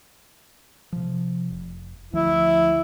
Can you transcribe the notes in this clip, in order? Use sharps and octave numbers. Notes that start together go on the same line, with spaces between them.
C3 F3
F1
D2 F3 E4